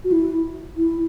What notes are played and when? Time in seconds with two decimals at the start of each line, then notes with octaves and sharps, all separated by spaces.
0.04 F#4
0.12 E4
0.77 E4